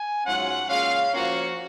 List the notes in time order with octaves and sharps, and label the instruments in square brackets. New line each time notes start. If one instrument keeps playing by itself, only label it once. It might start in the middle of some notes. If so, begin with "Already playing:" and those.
Already playing: [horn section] G#5
G#2 F#3 C#4 F4 F#5
A#2 G#3 C#4 F4 F5
F3 A#3 C#4 F4 F#4